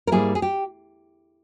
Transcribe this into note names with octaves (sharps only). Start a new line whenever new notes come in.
A#4
G#2 G3 A#3 E4 G#4
G#4
G4